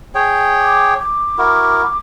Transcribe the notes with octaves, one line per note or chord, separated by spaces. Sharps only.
G#4 C#5 G5
D6
D6
E4 F#4 A#4